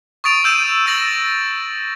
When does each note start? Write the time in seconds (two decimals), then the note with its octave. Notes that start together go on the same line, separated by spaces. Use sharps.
0.24 C#6 D#6 A6 D7 F7
0.44 E6 G6 D#7 E7
0.86 E6 A6 A#6 F#7